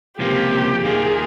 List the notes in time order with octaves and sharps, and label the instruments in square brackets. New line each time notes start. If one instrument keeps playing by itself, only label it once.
[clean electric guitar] C#2 C3 F3 A#3 F4 [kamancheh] G4
[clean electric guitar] D#2 D#3 A#3 F4 [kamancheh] G#4